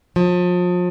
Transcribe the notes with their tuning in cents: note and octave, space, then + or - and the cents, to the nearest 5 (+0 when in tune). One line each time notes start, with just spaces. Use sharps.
F3 +35